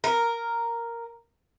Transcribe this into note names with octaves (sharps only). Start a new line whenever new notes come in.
A#4